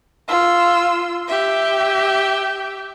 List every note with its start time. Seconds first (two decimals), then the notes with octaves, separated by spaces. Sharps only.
0.29 F4 E6
1.28 G4 E5